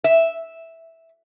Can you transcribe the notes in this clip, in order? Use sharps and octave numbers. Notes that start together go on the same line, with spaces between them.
E5